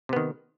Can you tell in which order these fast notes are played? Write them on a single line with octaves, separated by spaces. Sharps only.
C3 B3 D#3